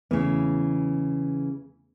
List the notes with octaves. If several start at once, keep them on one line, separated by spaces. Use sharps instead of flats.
E2 C#3 E3 A3 B3